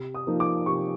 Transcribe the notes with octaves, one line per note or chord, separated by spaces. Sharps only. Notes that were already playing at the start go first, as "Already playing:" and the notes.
Already playing: C3
D#6
F3 A#3 D#4
D6
C3 C#6